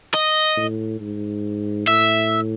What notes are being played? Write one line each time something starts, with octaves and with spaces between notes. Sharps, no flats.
D#5
A2
G#2
A2 E5